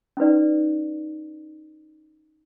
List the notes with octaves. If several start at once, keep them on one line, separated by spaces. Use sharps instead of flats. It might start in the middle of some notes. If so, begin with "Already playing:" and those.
C#4 D#4 B4 D5